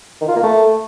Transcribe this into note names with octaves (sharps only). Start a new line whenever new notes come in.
D#3
F4
A#3
A3